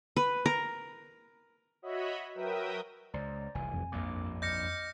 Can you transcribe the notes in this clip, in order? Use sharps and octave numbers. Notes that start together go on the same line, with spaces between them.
B4
A#4
F#4 C#5 D#5 E5 B5
F#3 A#4 B4 E5 G5 D#6
C#2 C5 D5 A#5
F1 C2 E3 G#5
F2
A#1 G2 A#2 A#3 D6
D#5 D6 F6 G6 A#6 C#7